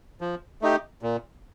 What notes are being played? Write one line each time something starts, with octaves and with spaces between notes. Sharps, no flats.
F3
A3 D#4 G4
A#2